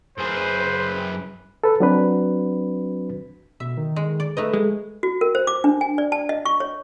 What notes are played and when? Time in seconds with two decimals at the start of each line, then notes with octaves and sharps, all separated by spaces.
0.18 F#2 G#4 B4 C5
1.64 A4 B4
1.80 F#3 C4 D4 F#4 B4
3.60 B2 E5
3.77 D#3
3.96 G#3
4.20 D5
4.37 A3 D#4 B4 D#5
4.54 G#3
5.03 F#4
5.21 A#4
5.35 C5
5.47 D6
5.64 D4
5.81 G#5
5.98 D5
6.12 A5
6.29 D#5
6.45 C#6
6.60 C#5